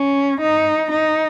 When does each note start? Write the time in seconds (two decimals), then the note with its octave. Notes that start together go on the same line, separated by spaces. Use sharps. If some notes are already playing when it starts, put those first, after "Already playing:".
Already playing: C#4
0.41 D#4
0.91 D#4